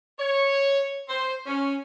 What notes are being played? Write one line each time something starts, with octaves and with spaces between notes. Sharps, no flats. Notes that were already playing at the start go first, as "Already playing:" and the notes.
C#5
C5
C#4